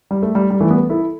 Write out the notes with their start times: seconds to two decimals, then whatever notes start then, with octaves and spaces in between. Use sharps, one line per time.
0.11 G3
0.23 A3
0.35 G3
0.51 G3
0.60 E3 A3
0.70 G3 B3
0.90 E4 A4